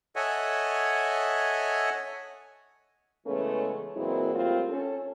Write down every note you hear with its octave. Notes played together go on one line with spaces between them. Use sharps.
A4 C#5 D#5 E5 F#5 G#5
C#3 E3 G#3 A3 B3 C#4
A#2 E3 F#3 G#3 C4 E4
A2 G3 A#3 C4 F4
C#4 A4